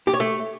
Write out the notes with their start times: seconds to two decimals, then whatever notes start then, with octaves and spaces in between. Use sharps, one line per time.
0.07 G4
0.14 C#5
0.20 A3